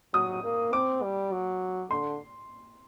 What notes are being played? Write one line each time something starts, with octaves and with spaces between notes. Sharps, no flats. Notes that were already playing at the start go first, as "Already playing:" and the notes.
F#3 D#6
A#3
C4 D6
G3
F#3
D3 C6